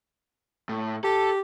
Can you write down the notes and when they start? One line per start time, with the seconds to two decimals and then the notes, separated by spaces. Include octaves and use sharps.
0.69 A2
1.04 G4 A4